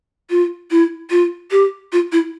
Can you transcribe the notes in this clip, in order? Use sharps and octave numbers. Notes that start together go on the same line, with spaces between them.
F4
E4
F4
G4
F4
E4